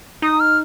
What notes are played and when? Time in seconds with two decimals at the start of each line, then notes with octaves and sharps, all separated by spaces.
0.22 D#4 D#6
0.40 F6